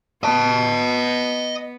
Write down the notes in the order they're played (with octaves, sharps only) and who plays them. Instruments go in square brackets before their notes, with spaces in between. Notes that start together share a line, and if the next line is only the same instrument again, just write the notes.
[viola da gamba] B3 [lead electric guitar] D#5 A5